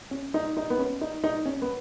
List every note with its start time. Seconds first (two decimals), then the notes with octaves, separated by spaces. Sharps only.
0.11 C#4
0.34 D#4
0.57 D#4
0.70 B3
0.79 C#4
1.01 D#4
1.24 D#4
1.46 C#4
1.62 B3